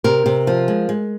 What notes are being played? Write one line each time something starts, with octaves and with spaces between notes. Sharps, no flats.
C3 A#4
C3
F3
G#3
G#3